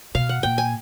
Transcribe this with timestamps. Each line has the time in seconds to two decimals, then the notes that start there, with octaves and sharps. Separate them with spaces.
0.15 B2 F5
0.29 F#5
0.43 A#2 G5
0.58 G#5